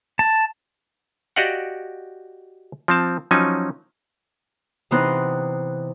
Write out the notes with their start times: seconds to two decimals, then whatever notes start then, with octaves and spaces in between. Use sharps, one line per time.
0.19 A5
1.36 F#4 G4 D5 D#5 F5 F#5
2.88 F3 C4 A5
3.31 F3 F#3 C#4 D#4 G#5
4.91 C3 E3 B3 D#4 C5 F#6